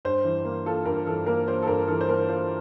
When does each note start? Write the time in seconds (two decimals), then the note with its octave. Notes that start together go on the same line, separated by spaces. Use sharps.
0.05 G2 C5
0.25 E3
0.45 A#3
0.66 F4 A4
0.86 G2 A#4
1.07 E3 A4
1.26 A#3 A#4
1.47 F4 C5
1.62 A4
1.67 G2 A#4
1.88 E3 A4
2.01 C5
2.08 A#3 A#4
2.29 F4 C5